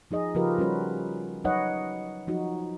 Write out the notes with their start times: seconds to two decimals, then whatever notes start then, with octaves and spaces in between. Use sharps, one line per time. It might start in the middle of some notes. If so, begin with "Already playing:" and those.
0.11 F3 D#4 G#4 D#5
0.34 C#3 F3 F4 G4 A#4 B4
0.58 G3 C#4 F#4 B4
1.44 F#3 D#4 B4 C#5 D#5 F#5
2.27 F3 F#3 D#4 F#4